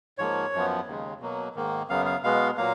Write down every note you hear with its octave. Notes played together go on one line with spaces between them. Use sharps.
G#2 F3 A#3 C#5
F#2 F3 B3
D#2 C#3 G#3
B2 F#3 A#3
G#2 D#3 A#3
F#2 C#3 F#3 B3 F5
F5
B2 G#3 B3 F5
A#2 F#3 A#3 F5